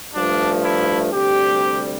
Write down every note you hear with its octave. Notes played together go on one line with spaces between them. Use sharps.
G2 F3 A3 D4
E4
D2 C3 G3 G4